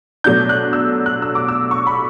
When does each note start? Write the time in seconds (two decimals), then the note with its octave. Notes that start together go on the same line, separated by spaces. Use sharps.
0.24 B2 F#3 A3 D4 G6
0.49 F#6
0.73 E6
1.06 F#6
1.22 E6
1.35 D6
1.48 E6
1.71 C#6
1.87 B5